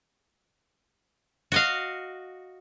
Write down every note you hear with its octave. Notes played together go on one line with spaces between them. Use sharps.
F#4 D#5 F5